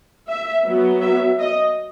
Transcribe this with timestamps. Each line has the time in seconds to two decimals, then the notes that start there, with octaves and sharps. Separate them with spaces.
0.28 E5
0.65 F#3 B3
1.01 E5
1.39 D#5